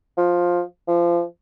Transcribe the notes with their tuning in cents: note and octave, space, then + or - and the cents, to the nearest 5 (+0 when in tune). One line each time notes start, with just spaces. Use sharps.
F3 +10
F3 -25